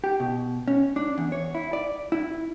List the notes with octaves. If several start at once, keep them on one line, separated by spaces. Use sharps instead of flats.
G4
B2
C#4
D4
E2
C#5
E4
D5
E4